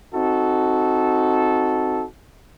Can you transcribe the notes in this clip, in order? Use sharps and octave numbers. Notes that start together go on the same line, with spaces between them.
C4 D#4 F#4 A4